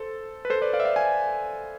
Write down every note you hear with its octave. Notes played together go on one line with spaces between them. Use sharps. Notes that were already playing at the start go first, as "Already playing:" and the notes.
Already playing: A4 C5
B4
A4 C5
B4 D5
D5 F5
E5
D5 F5
G#5